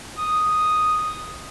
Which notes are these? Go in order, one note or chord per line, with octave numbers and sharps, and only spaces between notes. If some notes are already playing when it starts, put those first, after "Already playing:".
D#6